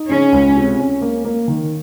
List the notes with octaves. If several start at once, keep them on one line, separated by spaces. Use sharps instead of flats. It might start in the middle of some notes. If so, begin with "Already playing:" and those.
Already playing: D#4
C#3 C#4
C#2
C3
C#4
A#3
A#3
D#3